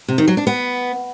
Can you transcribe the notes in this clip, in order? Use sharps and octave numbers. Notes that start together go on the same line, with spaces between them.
C3
D#3
F#3
D4
B3